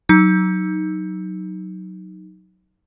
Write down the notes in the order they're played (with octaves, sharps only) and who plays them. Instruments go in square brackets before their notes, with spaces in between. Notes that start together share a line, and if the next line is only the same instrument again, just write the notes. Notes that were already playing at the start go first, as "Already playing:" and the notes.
[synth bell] F#3 D#4